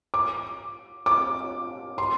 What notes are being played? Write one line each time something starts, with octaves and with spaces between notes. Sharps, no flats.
D6
D6
C6